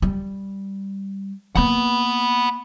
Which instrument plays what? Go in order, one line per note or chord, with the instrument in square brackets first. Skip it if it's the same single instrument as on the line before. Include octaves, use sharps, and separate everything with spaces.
[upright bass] G3
[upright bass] A#3 B3 [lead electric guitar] F#5 B5